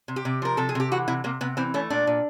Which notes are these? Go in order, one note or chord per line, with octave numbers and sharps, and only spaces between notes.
C3
G4
C3
F3 A#4
C3 A4
G#4
C3 G4
E3 F#4
C3 E4
C3 A#3
C3 B3
E3 C4
A3 C#4
A#2 D4
A#2